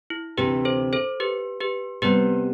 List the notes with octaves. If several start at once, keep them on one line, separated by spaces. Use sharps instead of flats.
E4
D2 C3 E3 G4 B4
A4 C5
A4 C5
G4 B4
G4 B4
C3 G3 B3 G4 B4